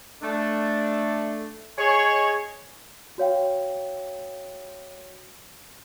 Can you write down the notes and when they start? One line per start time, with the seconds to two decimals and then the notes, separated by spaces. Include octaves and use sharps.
0.22 A3 D4
1.78 G#4 C#5 D#5
3.18 F#4 C#5 F5 G5